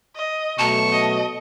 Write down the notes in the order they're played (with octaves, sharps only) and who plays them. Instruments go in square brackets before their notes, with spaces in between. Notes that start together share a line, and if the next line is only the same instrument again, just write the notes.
[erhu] D#5
[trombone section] B2 F#3 A3 [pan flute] A5 [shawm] C#6
[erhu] D#5